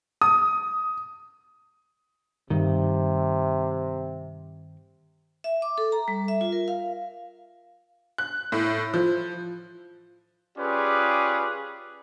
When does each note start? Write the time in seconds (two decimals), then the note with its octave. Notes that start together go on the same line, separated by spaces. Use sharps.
0.22 D#6
2.50 G2 C3 D#3
5.44 E5
5.62 D6
5.78 A4
5.92 A#5
6.08 G3
6.28 E5
6.41 F4
6.52 A#4
6.68 F5
8.18 F#6
8.52 A2
8.94 F3
10.58 C#4 F4 G4 G#4 B4 D5